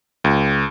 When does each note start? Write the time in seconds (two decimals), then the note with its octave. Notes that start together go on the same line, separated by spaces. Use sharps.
0.24 C#2